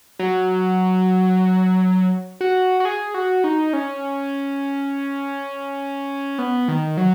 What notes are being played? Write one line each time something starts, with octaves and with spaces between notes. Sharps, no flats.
F#3
F#4
F#4
G#4
F#4
D#4
C#4
B3
D#3
F#3